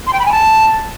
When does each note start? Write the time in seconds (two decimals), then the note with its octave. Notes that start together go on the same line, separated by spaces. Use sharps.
0.06 C6
0.12 G5
0.19 B5
0.25 G#5
0.31 A5